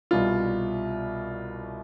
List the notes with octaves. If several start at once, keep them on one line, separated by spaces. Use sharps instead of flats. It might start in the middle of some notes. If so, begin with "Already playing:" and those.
C2 B2 G3 F4